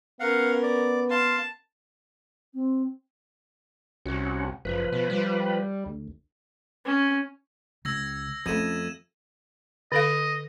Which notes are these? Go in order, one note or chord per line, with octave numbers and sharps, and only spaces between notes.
B3 C#4 A#4 F5 F#5
D5
F5 A5 C6
C4
C2 C#4 F#4
F#1 F3 B4
B2
G3
D2
C#4
C#2 E6 G#6 A#6
F2 A3 C#4 F4 G#6 D#7 E7
D3 A4 D#5 F5